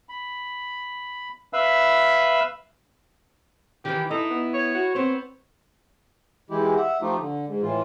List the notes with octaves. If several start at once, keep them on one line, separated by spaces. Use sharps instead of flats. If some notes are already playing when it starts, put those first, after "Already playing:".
B5
B4 E5 F5 B5 E6
D#3 E3 G4
D#4 E4 A4
B3
C#5
F#4
B3 C4 C5 C#5
E3 G#3 E4 G4
E5 F#5
F3 A3 D#4 F4 G4
D3
G#2
A2 E3 F4